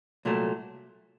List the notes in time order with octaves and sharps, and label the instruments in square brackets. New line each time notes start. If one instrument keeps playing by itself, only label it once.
[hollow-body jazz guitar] C2 A#2 F#3 A3